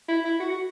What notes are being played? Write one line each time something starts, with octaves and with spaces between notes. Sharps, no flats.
E4
E4
F#4
F#4